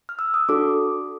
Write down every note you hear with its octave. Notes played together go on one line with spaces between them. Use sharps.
F6
E6
D#6
D4 F#4 A4 D6